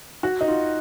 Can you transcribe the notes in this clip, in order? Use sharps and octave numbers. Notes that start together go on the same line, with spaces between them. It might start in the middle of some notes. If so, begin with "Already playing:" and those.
F#4
D#4
F4